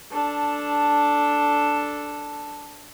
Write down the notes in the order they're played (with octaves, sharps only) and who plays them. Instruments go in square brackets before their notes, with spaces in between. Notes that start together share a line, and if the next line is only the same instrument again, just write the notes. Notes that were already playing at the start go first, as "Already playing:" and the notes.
[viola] D4 A4